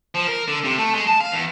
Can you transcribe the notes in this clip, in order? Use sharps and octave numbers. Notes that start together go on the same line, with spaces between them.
F3
A#4
D3
C3
A3
G#3
A5
F5
E2